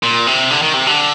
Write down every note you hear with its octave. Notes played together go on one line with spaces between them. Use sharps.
A#2
C3
D3
D#3
C3
D3